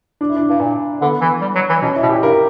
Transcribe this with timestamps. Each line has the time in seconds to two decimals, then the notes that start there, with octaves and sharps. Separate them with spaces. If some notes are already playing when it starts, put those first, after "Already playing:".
0.21 D4
0.29 E4
0.36 D4
0.49 G2
0.61 A#2
1.01 D3 B3
1.21 E3
1.41 G3
1.55 F#3
1.69 E3
1.82 B2 C#4
1.96 E4
2.02 B2
2.09 A#2 G4
2.23 G2 A#4